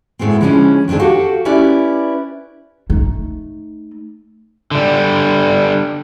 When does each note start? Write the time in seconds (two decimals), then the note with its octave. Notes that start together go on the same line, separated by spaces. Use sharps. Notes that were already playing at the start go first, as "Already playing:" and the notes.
0.19 D2 A2 G#3 B3 C4
0.41 D3 E3 F3 G#3 B3 C#4
0.88 D#3 B3 C4 D4 G#4
0.99 F#4 G4 A4 F5 F#5
1.45 C#4 E4 G4 B4 D5
2.90 A3 D#4
4.71 D3 G3